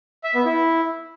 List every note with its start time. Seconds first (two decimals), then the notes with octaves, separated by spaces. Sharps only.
0.24 E5
0.34 B3
0.45 E4